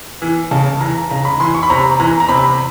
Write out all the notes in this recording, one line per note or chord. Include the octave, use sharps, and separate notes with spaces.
E3
C#3 A5
E3 A#5
C#3 A#5
B5
E3 C6
C#6
B5
C3 A#5
E3 A#5
A#5
C3 B5